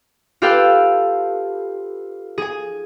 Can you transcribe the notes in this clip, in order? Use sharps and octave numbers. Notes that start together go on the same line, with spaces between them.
F4 G4 A4 B4 F5 G5
G#4 G#5